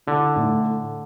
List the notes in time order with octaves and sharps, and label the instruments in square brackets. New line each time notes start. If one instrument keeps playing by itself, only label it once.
[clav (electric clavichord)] D3 [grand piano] E4
[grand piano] A2